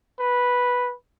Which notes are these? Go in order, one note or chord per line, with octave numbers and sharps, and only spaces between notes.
B4